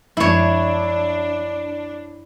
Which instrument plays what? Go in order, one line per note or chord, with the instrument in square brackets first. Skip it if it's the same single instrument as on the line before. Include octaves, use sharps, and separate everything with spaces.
[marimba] F#2 F3 G#3 [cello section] D4 [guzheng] E4 C#5